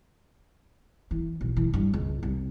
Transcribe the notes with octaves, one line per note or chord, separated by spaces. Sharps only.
E3
B1
E3
G2
C#2
C2